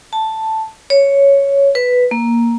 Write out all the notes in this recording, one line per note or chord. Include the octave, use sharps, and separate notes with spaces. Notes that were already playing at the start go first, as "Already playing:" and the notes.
A5
C#5
B4
A#3